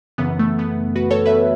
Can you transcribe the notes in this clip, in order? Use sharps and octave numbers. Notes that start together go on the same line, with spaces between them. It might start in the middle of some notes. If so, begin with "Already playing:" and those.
F#2 C#3 E3 B3
A3
B3
F#4 B4
A4 C#5
B4 E5